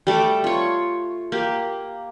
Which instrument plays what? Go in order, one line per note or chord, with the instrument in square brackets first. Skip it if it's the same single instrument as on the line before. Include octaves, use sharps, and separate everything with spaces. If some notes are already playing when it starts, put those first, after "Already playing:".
[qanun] G3 A3 A4 D6
F4 C#5
A#3 G4